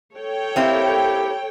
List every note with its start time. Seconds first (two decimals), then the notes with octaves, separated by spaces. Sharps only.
0.15 A4 C#5 G5
0.56 A#3 C4 E4 G4